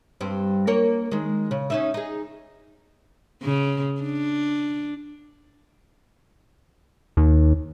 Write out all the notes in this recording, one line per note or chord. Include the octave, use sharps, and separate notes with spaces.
G2 C4
A#3 A#4 C#5
D#3 G#3
C#3
C#4 D#4 E5
D#4 G#4
C#3
D4
D#2